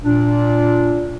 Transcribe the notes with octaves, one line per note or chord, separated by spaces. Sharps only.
A#2 D4